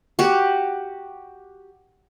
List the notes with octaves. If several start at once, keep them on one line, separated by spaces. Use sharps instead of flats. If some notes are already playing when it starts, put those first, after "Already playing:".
F#4 G4